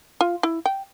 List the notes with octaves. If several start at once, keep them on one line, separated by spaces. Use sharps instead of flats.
F4
E4
G5